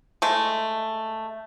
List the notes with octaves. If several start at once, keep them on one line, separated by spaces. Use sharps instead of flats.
G#3 A3